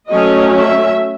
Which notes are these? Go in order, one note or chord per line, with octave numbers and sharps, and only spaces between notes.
F#3 A3 C#4 D#5
E5